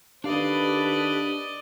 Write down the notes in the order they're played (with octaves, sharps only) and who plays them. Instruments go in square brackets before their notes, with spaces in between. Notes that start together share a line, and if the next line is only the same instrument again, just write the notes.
[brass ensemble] D#3 A4 B4 [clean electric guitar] D4 F5 [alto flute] G4 [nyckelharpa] D5 D#5